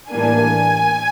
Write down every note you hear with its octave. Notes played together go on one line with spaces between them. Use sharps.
A2 E3 G3 A#3 D4 G#5